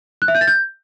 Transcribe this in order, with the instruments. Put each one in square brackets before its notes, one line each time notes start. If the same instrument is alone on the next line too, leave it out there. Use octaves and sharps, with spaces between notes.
[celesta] F#6
E5
G6
A6
G6